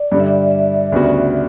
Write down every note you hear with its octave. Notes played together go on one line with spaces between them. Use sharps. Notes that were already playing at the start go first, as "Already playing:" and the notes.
Already playing: D5
G2 D3 G3 D5
E5
D5
E5
D2 C#3 G3 B3 F#4